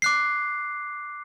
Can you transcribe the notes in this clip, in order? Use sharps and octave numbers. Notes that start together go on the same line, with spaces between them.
D6 F#6 C7